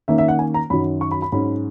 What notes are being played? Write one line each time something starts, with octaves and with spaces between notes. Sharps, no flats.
D#3 A#3 C#4 E5
E5
F#5
G#5
A#5
F#2 D#3 F#3 B5
C#6
B5
B5
G#2 F#3 C#4 B5